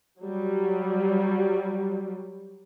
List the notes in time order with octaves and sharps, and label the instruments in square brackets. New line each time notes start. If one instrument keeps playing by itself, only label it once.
[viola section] F#3 G3